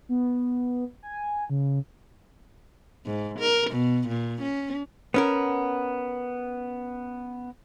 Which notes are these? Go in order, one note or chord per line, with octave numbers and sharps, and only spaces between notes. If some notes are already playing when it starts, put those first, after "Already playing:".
B3
G#5
C#3
G#2
A#4
B2
A#2
C#4
B3 C#4 A#4